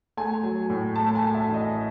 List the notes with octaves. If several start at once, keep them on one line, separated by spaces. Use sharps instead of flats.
A3 G#5
F#3
A2
A3 A5
A5
G#5
A3
E5
A1
D#5